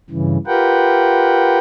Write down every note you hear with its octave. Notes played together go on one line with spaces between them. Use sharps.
G2 C#3 E3
F4 G4 A#4 B4 F#5 G5